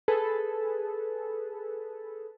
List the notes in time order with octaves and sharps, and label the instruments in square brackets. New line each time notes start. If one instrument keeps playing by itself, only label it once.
[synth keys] G#4 A4 B4